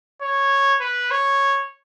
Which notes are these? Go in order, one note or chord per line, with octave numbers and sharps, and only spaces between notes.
C#5
B4
C#5